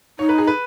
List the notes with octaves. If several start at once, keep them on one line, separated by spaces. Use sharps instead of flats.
D#4 C#5
B4
G#4
B4